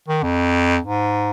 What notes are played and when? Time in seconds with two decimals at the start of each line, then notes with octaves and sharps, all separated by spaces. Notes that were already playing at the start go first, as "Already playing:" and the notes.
0.08 D#3
0.23 F2
0.83 G#2